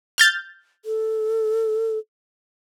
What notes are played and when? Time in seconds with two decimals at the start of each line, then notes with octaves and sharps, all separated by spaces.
0.18 F6 G6 A6
0.85 A4